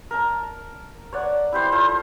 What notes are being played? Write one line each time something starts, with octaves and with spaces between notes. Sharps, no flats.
A#4 A5
C#5 D5 F#5
E4 G4 C5
F4 A4 C5 C#6